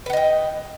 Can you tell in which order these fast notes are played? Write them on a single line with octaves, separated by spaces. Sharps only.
B4 F#5 D#5 G5